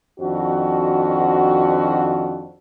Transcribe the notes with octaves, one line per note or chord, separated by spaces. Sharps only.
F2 D#3 D4 F#4